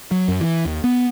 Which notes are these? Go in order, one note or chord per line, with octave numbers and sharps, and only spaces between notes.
F#3
F#2
E3
D#2
B3